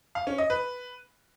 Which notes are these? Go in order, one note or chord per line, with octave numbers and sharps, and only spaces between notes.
F5
C#4
D#5
B4